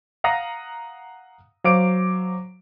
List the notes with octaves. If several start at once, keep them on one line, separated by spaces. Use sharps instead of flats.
F5 F#5 A#5 D#6 A#6
F#3 C5 F5 D6 D7